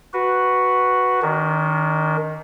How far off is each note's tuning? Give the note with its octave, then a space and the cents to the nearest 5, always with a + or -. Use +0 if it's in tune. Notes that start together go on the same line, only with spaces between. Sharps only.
F#4 +0 B4 +0
D#3 +0 D4 -40